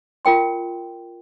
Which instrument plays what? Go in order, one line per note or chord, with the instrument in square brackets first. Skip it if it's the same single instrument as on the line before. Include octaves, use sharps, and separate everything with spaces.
[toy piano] F4 A#4 G5 C6